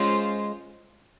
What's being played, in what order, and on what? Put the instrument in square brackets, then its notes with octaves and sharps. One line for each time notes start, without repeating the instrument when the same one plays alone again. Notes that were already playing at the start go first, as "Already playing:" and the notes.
Already playing: [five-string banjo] G#3 [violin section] C#4 F4 C5